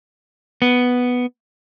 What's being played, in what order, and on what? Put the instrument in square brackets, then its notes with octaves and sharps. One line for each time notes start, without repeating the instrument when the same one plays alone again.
[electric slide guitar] B3